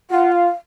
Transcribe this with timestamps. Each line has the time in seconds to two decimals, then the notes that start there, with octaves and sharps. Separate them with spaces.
0.10 F4 F#5
0.32 F5